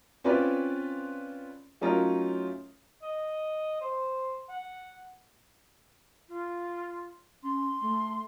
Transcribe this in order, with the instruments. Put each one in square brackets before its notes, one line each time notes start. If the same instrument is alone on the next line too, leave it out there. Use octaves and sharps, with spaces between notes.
[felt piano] C4 C#4 F4 B4 D5
F#3 A3 C#4 D#4 F4 A#4
[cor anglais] D#5
C5
F#5
[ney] F4
[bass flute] C#4 [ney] C6
[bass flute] A3